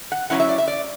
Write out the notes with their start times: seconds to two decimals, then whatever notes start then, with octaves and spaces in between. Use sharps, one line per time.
0.12 F#5
0.30 F#3 A#3 C#4 E4 F#5
0.40 E5
0.49 D5
0.58 E5
0.68 D5